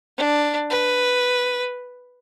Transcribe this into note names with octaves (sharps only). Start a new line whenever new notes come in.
D4
B4